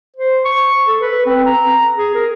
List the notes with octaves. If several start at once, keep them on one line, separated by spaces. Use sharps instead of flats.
C5
C#6
A4
B4
C4
A#5
G#4
A#4